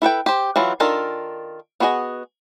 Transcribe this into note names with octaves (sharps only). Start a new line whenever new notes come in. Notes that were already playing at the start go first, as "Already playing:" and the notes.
E4 A4 B4 G5
G4 C5
E3 F#3 E4 F4
D#3 D4 F4 A4 A#4
B3 D4 F#4 G#4 D#5